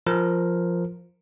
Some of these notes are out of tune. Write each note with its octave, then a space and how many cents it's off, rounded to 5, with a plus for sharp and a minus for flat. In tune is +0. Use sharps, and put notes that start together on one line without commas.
F3 +0 A#4 +0